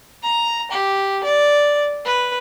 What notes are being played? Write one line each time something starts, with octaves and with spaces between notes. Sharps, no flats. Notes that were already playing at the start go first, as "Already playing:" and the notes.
A#5
G4
D5
B4